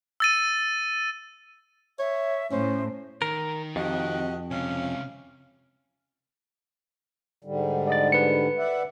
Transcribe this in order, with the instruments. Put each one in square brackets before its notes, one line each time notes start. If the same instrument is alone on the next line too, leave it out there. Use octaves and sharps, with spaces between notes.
[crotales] E6 A6 D#7
[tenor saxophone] C#5 [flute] E5
[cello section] A2 [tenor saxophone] C#4 [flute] C5
[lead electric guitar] D#3 [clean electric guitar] A#4
[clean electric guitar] F2 [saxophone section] C3 F#4 D#5
[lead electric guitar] C#2 C3 [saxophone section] C#4 F5
[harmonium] G#2 D3 G3
[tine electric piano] D5 D#5 A6
B4 C#7
[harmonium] D5 E5 F#5